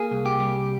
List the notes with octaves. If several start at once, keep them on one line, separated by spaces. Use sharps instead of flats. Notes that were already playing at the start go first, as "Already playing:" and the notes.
Already playing: A#3 G#4
C2
G4
G3